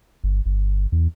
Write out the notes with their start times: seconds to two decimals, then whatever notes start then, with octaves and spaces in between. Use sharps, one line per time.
0.24 G1
0.46 G1
0.92 E2